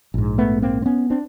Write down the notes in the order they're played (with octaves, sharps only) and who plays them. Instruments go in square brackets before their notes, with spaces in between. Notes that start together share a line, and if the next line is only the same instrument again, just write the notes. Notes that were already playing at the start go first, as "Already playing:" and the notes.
[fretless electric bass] A#1 G#2
A3 B3
A#3 C4
C4
B3 C#4
C4 D4